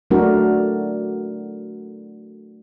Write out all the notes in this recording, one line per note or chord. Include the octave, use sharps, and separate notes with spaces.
F#3 A3 D4 F#4 A#4